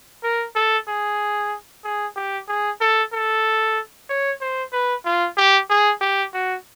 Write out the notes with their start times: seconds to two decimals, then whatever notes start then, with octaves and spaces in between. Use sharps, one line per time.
0.23 A#4
0.55 A4
0.88 G#4
1.84 G#4
2.16 G4
2.48 G#4
2.81 A4
3.13 A4
4.09 C#5
4.41 C5
4.73 B4
5.05 F4
5.37 G4
5.70 G#4
6.01 G4
6.34 F#4